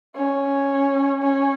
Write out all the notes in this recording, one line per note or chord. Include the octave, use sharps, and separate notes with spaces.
C#4
C#4